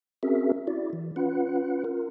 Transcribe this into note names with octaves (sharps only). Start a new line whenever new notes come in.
C4 C#4 F#4 G#4 A#4 E5
E4 F#4 D5
E3
C#4 F4 B4 F#5
F4 A#4